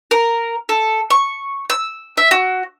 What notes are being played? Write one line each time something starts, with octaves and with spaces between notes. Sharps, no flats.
A#4
A4
C#6
E6
E5
F#4